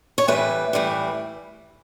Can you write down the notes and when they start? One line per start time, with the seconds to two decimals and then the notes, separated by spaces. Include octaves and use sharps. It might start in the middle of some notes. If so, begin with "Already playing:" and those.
0.18 C#5
0.28 A2 E3 G3 B4
0.73 A2 E3 G3